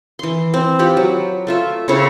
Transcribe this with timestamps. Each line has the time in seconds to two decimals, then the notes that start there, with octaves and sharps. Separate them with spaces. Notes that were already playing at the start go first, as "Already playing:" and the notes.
0.19 E3 C6
0.54 C4
0.79 F4 G4 B5
0.97 F#3
1.47 A3 F4 E5
1.88 C#3 C4 E4 C#5